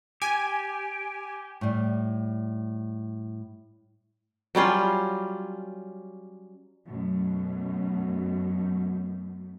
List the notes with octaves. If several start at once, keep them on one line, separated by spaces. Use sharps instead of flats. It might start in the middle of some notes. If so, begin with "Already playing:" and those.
G4 G#5
A2 G3
F#3 G3 C#4 F4
F#2 B2 A3